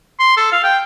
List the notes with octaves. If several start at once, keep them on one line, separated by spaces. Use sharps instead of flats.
C6
A4
F5
G5